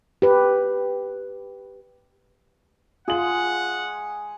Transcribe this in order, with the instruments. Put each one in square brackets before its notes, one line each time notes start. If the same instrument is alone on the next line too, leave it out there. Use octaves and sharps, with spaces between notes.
[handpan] G4 B4
[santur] G#3 G#4 [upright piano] F4 F#7 [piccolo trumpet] F#5